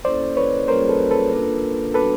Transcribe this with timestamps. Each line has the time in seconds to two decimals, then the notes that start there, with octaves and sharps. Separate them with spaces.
0.05 A#3 C#4 E4 A4 C5 D5
0.37 B4 C#5
0.68 G3 A#3 C#4 F4 G#4 A#4 C5
0.89 A4 B4
1.11 A4 B4
1.32 A#3 D4 F4 A#4
1.94 G3 B3 D4 F#4 A4 B4